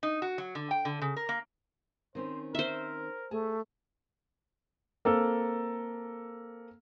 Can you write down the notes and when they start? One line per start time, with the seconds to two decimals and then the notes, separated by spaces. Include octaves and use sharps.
0.03 D#4
0.22 F#4
0.38 F#3
0.55 D3
0.71 G5
0.85 D3
1.01 C#3
1.16 A#4
1.29 A#3
2.15 D#3 C4 C#4 C5
2.55 A#4 C5 E5
3.31 A3 G#4 A5
5.05 A#3 C4 A4